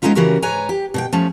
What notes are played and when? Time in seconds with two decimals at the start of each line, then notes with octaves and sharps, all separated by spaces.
0.02 G#3 B3 C#4 D#4 F4 E5
0.15 C#3 E3 C#4 F#4 G4 A#4
0.42 G#2 B4 C#5 G#5 A#5
0.69 G4
0.94 B2 C5 G5
1.13 F3 A3 C#4